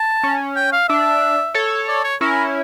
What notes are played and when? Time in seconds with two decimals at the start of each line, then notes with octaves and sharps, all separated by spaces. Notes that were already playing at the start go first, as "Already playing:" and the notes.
Already playing: A5
0.23 C#4
0.56 G5
0.73 F5
0.89 D4 E5
1.54 A4 C#5
1.88 D5
2.04 C#5
2.21 C#4 E4 A#4